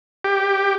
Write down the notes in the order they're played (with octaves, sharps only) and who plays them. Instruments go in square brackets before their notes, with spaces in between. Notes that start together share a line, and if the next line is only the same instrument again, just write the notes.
[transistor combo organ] G4